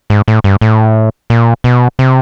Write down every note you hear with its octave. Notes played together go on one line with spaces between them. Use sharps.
G#2
A2
G2
A2
A#2
B2
C3